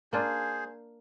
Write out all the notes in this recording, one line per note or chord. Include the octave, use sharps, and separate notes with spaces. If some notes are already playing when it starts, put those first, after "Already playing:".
A#3 D4 F4 G#4 C5